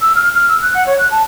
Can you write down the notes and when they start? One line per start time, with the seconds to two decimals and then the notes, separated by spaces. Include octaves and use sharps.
0.01 E6
0.15 F6
0.34 F6
0.49 E6
0.62 F#6
0.75 F#5
0.87 C#5
0.99 F#6
1.11 A5